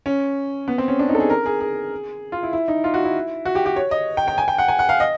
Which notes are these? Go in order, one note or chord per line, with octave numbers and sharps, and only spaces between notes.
C#4
B3
C4
C#4
D4
D#4
A4
G#4
A#4
G#4
G#4
F4
E4
E4
D#4
F4
F#4
E4
F#4
G4
G4
C#5
D#5
G5
G5
G#5
G5
F#5
G#5
F#5
F5
D#5